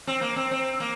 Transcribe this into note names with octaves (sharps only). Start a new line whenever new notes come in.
C4
A#3
C4
C4
A#3